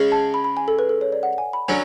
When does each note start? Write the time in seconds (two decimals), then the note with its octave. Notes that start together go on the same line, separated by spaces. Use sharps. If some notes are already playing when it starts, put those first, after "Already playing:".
Already playing: C#3 G#3 C#4
0.12 A5
0.34 B5
0.44 B5
0.57 G#5
0.68 A4
0.79 B4
0.89 A4
1.01 C#5
1.12 D5
1.23 F#5
1.38 G#5
1.53 B5
1.68 D3 F#3 C#4 G#5